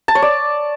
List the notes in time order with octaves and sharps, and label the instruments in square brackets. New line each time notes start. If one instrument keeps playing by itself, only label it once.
[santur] A5
C#5
D5